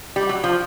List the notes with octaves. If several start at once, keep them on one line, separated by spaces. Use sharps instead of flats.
G3
F#3
F3